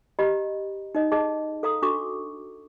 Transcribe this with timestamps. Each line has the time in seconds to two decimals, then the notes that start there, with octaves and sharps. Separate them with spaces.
0.19 G4 D#5 A#5 B5
0.95 D#4 D#5
1.12 G#4 D#5 A5
1.63 A4 F5 A#5 D#6
1.82 D4 F#4 A4 C#6 D6